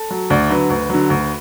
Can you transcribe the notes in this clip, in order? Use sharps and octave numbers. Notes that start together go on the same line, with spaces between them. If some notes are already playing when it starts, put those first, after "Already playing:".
Already playing: A4
F#3
D2 D5
D3 F#3 B4
D2
D3 F#3
D2